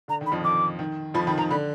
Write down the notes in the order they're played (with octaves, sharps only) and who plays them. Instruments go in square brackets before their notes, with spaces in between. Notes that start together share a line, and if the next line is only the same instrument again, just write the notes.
[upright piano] D3 [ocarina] A#5
[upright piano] D#3 [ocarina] B5
[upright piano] F2 F3
[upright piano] D#3 [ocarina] D6
[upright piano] D#3
[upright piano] F2 F3 [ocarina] B5
[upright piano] D#3 [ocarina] B5
[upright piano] D#3 [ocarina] A#5
[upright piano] D3 [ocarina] B5